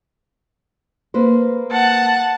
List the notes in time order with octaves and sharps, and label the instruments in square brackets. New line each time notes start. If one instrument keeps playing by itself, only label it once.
[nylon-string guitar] A#3 B4 C5
[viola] F#5 A5